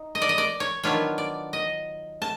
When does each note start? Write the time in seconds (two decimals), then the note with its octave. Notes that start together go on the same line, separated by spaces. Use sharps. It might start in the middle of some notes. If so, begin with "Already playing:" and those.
Already playing: D#4
0.15 D#5
0.22 D5
0.29 D#5
0.38 D5
0.60 C#5
0.83 D#3 F#3 B3 D4 F4 C#5
1.18 D5
1.53 D#5
2.22 A5